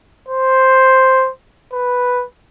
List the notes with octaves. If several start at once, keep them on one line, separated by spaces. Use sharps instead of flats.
C5
B4